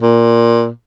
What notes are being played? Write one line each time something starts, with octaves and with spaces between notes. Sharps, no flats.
A#2